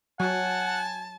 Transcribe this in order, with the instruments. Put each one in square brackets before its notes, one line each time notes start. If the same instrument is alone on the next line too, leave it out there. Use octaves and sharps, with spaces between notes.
[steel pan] F#3 [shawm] F#5 [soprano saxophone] G#5 [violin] A5